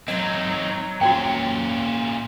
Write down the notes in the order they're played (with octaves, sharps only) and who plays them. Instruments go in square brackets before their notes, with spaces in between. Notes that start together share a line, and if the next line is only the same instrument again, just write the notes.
[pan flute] F#3 [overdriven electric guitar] C4 D#4 [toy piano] D#5
[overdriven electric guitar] A#2 C#4 [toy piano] F#4 C5 G5